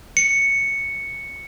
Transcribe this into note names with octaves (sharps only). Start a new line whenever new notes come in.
C#7